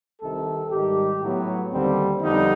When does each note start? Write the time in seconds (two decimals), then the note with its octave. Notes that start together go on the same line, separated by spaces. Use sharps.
0.21 C2 C3 D#3 A4
0.71 G#2 D#3 G3 G4
1.21 A2 F#3 B3
1.72 D#2 D3 G3 C4
2.22 F2 D3 G3 B3 D#4